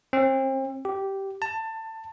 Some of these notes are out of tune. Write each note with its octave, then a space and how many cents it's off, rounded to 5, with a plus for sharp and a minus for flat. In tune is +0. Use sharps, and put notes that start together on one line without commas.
C4 +35
G4 -10
A5 +20